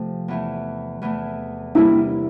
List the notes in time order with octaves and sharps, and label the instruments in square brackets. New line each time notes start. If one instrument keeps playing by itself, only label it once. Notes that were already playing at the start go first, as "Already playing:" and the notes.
Already playing: [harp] C3 F3 A3
E2 E3 A3
E2 E3 A3
[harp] C3 E3 G3 A#3 [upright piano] E4